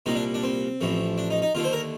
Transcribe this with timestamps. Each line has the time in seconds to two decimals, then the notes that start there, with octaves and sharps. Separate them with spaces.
0.06 C2 A#2 G3 D#4
0.16 D4
0.34 D4
0.43 C4
0.81 A1 A2 F3 A3
1.18 D4
1.30 D#4
1.42 D#4
1.55 D#2 D3 A3 F4
1.64 C5
1.73 A#4